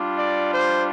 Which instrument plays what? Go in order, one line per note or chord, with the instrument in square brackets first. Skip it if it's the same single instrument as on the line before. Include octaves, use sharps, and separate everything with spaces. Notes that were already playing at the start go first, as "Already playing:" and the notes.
Already playing: [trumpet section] G3 D4 F4
D5
C5